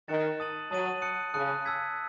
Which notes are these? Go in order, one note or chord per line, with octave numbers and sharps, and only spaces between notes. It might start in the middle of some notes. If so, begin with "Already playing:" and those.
D#3 F#6 A6 C#7 E7
A5 D#6 A6 D#7 F#7
F#3 A5 D#6 A6 D#7 F#7
A5 D#6 F#6 C#7
C#3 A5 D#6 F#6 C#7
A5 E6 G#6 B6